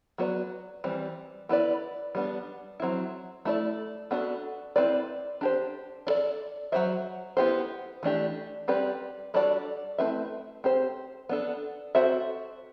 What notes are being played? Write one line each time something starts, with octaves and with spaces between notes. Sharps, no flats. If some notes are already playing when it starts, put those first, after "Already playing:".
F#3 B3 F#4 B4 D5
E3 G3 C4
B3 E4 B4 D5
G3 B3 D4
F#3 C4 E4
A3 E4 A4 D5
B3 D4 F#4 A4
C4 E4 B4 D5
D4 G4 C5
D4 A4 D5
F#3 C4 F#4 C5 E5
B3 E4 G4 C5
E3 A3 D4 G4
G3 C4 G4 B4 D5
G3 D4 F#4 A4 D5
A3 C4 E4 B4 E5
C4 G4 C5
B3 D4 A4
C4 F#4 A4 C5 E5